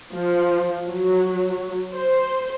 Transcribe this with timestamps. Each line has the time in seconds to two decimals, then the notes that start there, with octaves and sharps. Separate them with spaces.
0.15 F3
0.88 F#3
1.94 C5